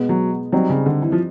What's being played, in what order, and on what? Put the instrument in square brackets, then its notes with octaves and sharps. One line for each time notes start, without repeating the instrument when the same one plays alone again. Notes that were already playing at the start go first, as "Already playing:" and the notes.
Already playing: [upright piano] B2 G#3 B3
[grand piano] F#3
[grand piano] F#3 [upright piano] G3 C4 D#4
[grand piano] C#3
D3
E3
F3